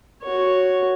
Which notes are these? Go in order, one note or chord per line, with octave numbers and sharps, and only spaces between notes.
F#4 C#5